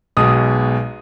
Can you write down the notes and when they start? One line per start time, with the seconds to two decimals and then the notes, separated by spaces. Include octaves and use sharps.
0.17 B1 B2 G#3 D#6